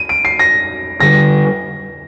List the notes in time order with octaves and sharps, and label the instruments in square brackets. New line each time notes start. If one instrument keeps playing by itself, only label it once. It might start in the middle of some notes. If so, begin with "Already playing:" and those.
Already playing: [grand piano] D#7
D7
C7
A#6
[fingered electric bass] D3 G3 [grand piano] A#6